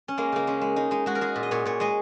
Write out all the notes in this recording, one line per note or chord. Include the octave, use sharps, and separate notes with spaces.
C#4
G#3 A#3
C#3 A#3
G#3 C#4
G#3
G#3 D#4
G#3 D#4
G#3 F#4
A#4
G#3 G#4
A#2
D#5
A#2 C#5
A#2 C#5
G#3 D#5